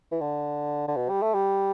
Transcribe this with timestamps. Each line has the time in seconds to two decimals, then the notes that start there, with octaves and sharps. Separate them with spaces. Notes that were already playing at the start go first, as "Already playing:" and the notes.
0.12 E3
0.21 D3
0.88 D3
0.96 B2
1.09 G3
1.22 A3
1.34 G3